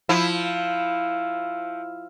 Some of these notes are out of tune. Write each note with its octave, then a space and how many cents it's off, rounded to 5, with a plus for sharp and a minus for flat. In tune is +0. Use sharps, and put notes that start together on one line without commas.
F3 +0 E4 +0